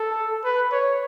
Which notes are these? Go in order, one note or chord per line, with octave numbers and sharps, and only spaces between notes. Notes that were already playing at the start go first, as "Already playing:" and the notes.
Already playing: A4
B4
C#5